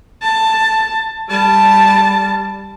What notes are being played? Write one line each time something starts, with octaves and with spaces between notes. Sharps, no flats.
A5
G3 A5